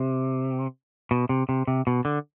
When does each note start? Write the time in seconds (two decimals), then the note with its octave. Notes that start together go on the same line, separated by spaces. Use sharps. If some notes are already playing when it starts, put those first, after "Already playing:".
Already playing: C3
1.11 B2
1.29 C3
1.49 C3
1.67 C3
1.87 B2
2.05 D3